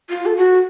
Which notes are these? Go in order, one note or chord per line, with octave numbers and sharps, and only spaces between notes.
F4
A4
F#4